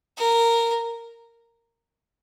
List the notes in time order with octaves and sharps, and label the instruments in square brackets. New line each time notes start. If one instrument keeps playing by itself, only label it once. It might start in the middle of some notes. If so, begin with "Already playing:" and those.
[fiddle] A#4